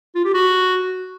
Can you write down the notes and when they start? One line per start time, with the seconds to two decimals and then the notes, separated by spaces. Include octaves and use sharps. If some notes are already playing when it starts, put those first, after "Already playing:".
0.15 F4
0.25 G4
0.34 F#4